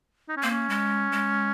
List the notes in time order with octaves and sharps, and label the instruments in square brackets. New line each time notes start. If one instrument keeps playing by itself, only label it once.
[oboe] D#4
C#4
[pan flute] A#3 [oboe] C4
[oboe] C#4
[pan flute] G#3
G#3